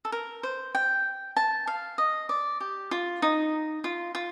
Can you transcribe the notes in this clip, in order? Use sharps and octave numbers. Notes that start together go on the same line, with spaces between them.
A4
A#4
C5
G5
A5
F5
D#5
D5
G4
F4
D#4
F4
F4